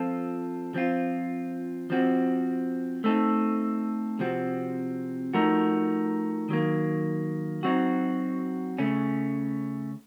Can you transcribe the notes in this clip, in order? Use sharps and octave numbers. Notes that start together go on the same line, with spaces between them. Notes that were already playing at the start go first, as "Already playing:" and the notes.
Already playing: F3 C4 F4 A4
F3 C4 F4
F3 C4 F#4
A3 C4 D#4 A4
C3 F3 C4 F#4
F3 A3 D#4 F#4 A#4
D#3 F#3 A#3
F#3 C4 D#4 F#4
C#3 A3 C#4